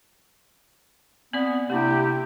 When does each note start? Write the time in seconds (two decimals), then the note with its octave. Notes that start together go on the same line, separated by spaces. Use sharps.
1.33 B3 C4 D5
1.70 C3 A#3 D4 E4 G4